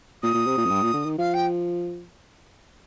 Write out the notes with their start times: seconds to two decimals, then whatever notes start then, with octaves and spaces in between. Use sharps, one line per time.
0.22 A#2 D#6
0.34 A#2
0.47 C3
0.57 A#2
0.65 F2
0.70 G2
0.82 A#2
0.93 D3
1.05 D#3
1.18 F3 F5
1.33 G5